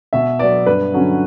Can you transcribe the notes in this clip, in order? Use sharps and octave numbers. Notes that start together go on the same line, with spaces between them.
B2 E5
F#3 B3 D5
G2 B4
D3 F#3 C#4